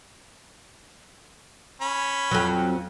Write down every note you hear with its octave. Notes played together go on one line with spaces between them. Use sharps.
C#4 B5
F2 F#3